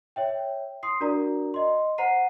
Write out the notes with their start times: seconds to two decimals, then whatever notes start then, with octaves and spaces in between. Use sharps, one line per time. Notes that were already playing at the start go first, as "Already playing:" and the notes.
0.16 C#5 E5 G5
0.83 C6 D#6 C7
1.01 D4 F#4 A#4 D5 A#5
1.54 D#5 C6
1.98 C5 F#5 A#5 C7 D#7